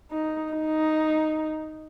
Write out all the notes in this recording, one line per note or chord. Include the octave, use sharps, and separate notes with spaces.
D#4
D#4